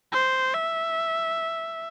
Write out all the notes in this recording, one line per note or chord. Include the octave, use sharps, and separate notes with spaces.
C5
E5